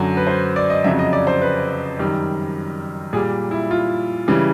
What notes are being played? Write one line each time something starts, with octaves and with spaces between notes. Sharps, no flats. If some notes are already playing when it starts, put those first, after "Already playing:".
Already playing: F#2 D3 F#3
B4
C5
D5
D#5
F2 C#3 F#3 E5
D#5
D5
C5
B4
F#2 D#3 G3
A#2 G3 G#4
E4
F4
C#3 E3 G3